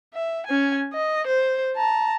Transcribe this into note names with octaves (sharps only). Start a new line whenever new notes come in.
E5
C#4 G#5
D#5
C5
A5 A#5